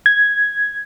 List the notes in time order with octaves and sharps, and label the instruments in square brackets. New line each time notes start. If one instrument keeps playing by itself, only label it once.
[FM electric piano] G#6